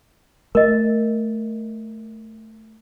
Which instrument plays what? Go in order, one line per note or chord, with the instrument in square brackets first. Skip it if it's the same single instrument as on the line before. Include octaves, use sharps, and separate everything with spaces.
[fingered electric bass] A3 [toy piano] A#4 D#5